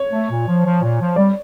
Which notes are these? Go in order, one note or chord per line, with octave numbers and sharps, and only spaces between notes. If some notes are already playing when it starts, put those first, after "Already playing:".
Already playing: C#5
A3
A#2
F3
F3
A#2
F3
G3 D5